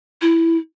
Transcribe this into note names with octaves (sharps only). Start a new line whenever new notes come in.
E4